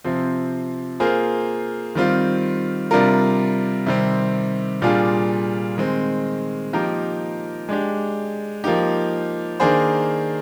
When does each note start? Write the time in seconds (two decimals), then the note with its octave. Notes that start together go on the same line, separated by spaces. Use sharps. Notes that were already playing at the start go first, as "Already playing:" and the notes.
0.04 C3 F3 C4
1.00 A#3 F4 G#4 C5
1.95 D#3 G3 C4 F4
2.91 C3 G3 D4 F4 A#4
3.86 C3 D#3 G3 C4
4.82 A#2 G3 D4 F4 G#4
5.77 D#3 G#3 C4
6.73 F3 A#3 D#4 G4 A#4
7.69 G#3 D4 G4
8.64 F3 A#3 D#4 G4
9.60 D#3 A#3 D4 G#4 C5